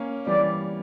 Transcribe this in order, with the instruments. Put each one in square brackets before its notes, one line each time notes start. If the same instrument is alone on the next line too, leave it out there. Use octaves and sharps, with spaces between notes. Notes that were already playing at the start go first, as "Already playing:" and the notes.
Already playing: [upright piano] A#3 C#4
[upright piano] E3 G3 [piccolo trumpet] D5